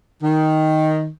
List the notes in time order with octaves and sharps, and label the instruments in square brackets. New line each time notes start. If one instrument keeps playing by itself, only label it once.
[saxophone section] D#3